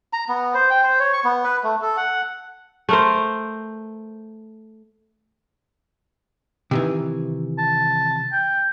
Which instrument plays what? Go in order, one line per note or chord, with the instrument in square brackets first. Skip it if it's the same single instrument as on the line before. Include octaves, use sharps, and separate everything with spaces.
[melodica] A#5
B3
C5
G5
C5
C#5
C#6
B3
B4
A3
A4
F#5
[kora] A3 A#4 C5
[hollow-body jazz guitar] C3 D#3 E3
[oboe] A5
G5